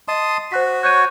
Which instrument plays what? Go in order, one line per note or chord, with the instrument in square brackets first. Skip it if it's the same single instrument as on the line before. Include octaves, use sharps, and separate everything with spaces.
[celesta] D#5 [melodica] A5 C6 D#6
[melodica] F#4 [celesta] C5 F#6 B6
[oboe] C#5 [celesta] F#6 G6 D#7